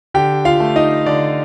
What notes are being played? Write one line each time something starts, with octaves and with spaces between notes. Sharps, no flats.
D3 G4 G5
F4 F5
A3
D#4 D#5
D3 D5